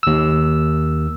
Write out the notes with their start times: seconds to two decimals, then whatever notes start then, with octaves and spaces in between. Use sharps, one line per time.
0.03 D#2 E6